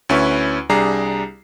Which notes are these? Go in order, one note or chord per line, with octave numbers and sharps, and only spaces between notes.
D2 C#4 E4 B4 C#6
C2 G3 D4 G#4 A#5 C7